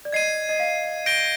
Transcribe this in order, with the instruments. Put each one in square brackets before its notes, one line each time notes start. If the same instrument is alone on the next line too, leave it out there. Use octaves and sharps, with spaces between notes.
[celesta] D5
[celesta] D#5 [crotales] G#6 C7 D#7
[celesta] D#5
F5
[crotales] G6 A#6 D7 G7